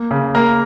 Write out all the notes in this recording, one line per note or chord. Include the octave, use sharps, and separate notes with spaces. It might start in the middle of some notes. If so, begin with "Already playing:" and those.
Already playing: A#3
C#3
A#3 A#4